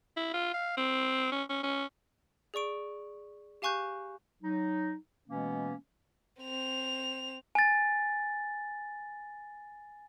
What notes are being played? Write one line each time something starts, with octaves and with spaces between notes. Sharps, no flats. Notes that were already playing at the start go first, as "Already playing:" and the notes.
E4
F4
F5
C4
C#4
C#4
C#4
G#4 D5 C#6 D7
G4 F5 G#5 C#6 F#6 G6
F#3 D#4
B2 E3 G#3 A#3 B3 C#4
C4 F7
G#5 A6